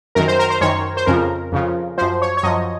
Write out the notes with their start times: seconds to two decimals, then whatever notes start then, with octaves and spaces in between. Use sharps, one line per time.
0.15 F#2 D#3 A#4
0.28 C5
0.39 A#4
0.50 C5
0.61 F#2 D#3 C#5
0.97 C5
1.07 F2 C#3 F3 A#4
1.52 F2 C#3 F3
1.98 F#2 F3 C5
2.22 C#5
2.37 C#5
2.43 F#2 F3 D#5